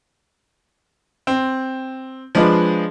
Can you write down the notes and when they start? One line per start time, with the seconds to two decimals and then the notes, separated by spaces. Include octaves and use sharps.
1.27 C4
2.35 F3 G#3 D4 G#4 B4 D5